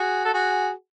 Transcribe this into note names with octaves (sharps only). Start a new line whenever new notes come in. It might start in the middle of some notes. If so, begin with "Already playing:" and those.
Already playing: F#4 G#4
A4
F#4 G#4